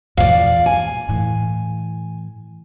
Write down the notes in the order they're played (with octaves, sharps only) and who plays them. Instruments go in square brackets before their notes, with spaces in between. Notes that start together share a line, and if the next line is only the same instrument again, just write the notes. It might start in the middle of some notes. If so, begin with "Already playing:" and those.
[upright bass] E2 A#2 [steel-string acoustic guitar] D5 F5
[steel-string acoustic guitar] G#5
[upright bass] A2 E3